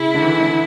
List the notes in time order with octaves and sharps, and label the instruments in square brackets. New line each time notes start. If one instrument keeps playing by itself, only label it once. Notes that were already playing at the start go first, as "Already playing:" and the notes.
Already playing: [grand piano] C#3 [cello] E4
[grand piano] D3
E3
D3